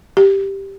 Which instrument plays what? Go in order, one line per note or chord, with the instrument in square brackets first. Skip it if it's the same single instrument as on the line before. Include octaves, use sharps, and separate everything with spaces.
[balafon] G4